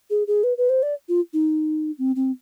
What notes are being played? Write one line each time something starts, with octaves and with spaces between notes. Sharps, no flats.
G#4
G#4
B4
B4
C5
D5
F4
D#4
C4
C4